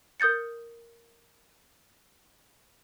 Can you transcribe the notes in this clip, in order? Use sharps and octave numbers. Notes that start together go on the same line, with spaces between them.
A#4 D#6 G6 A6 C#7